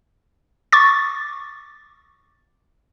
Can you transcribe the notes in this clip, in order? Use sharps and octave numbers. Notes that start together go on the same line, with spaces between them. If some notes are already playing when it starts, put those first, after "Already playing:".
C#6 D6 A6